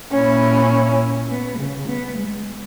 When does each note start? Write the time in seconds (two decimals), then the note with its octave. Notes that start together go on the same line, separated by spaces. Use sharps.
0.12 A#2 A#3 C#4 E4
1.29 B3
1.58 C#3
1.87 B3
2.17 G#3